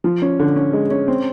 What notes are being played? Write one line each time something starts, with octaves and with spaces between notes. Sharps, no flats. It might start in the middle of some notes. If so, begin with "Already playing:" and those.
F3
C#4
D3
C#4
G#3
C#4
C4